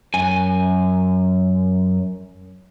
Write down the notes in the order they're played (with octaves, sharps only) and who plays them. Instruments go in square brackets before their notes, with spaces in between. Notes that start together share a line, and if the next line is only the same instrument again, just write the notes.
[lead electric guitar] F#2 G#5